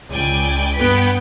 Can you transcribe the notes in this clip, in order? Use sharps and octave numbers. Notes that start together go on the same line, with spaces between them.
C#2 D5 G5 G#5
G2 B3 B4 G5 B6